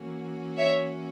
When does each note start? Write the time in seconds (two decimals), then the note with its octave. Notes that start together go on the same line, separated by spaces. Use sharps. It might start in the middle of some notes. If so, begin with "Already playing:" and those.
Already playing: E3 A#3 C#4 F#4
0.58 C#5 E5